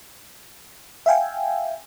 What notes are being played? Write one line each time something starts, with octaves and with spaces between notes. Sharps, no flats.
E5 F5 G5 G#5